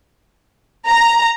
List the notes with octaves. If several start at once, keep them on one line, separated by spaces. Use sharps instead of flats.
A#5